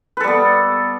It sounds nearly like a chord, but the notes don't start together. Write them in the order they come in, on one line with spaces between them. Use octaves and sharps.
B4 A4 G3 B3